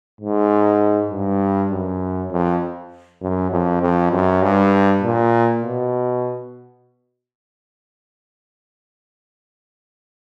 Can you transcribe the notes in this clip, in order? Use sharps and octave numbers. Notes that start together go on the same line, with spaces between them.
G#2
G2
F#2
F2
F#2
F2
F2
F#2
G2
A#2
B2